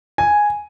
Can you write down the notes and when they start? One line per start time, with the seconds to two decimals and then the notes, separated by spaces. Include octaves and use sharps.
0.18 G#5